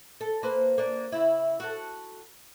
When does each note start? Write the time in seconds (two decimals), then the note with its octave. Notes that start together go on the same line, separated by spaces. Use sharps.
0.21 A4
0.43 A#3 B4 C5
0.78 A#3 D4
1.12 C#3 E4
1.60 F#4 A4